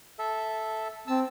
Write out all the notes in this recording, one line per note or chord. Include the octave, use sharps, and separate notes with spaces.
A4 E5
C4 A5 E6